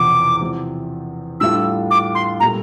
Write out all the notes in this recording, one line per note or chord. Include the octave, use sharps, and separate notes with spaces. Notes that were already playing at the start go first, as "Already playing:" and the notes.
Already playing: E1 E2 C3 F3 D6
E2 C3 F3 C4
A2 G3 D4 F4 E6
D6
C6
A#2 G3 A#3 F4 A4 A#5